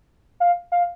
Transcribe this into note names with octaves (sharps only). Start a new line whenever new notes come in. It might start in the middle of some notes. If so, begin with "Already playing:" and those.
F5
F5